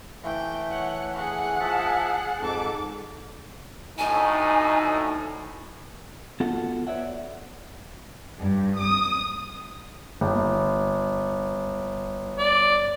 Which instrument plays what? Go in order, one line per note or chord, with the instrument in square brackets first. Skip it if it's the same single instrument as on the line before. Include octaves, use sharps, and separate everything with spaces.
[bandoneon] E3 A3 [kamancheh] G5
[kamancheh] C#5 F#5
G#4 F#5
[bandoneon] F3 E5 A5
[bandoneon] F2 G#2 [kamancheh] A4 D6
[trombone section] D2 A2 [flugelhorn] D#4 [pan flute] G#5
[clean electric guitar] B3 F4 F#4 A4 F#5
B4 C#5 D5 E5 F#5
[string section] G2
D#6
[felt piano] G1
[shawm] D5